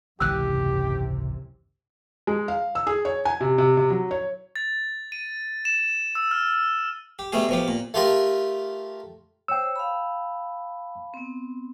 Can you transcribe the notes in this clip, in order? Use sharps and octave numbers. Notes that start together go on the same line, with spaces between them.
G#1 C#2 F#2 C3 E3 G4 E6 F#6
G#3
F5
E6
G#4
C#5
G#5
C3
C3
C3
F#3
C#5
A6
D#7
E7
E6
F6
G4
B2 G3 A3 G#4
B2 F3 G4
A#2
A3 F4 G4 A#4
C5 C#5 G5 E6
F5 A5 B5
B3 C4